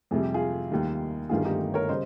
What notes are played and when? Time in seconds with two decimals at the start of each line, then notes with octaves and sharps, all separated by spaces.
0.11 F2 C3 G3 G#4
0.23 G4
0.34 F4 G#4
0.71 D#2 D#3 G3
1.29 G1 G2 D#3 G3 F4 G#4
1.44 D#4 G4
1.74 A#4 C#5
1.89 C#3 G3 C5 D#5